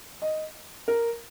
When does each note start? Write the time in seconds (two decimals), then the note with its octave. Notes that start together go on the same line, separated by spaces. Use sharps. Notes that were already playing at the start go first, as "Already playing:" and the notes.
0.22 D#5
0.88 A#4